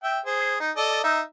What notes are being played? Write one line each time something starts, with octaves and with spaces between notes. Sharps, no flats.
E5 G5
G#4 C5
D#4
A4 D5 D#5
D#4 E5